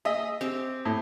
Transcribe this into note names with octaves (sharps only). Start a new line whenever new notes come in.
G#4 D#5 E5
C4 G4
A2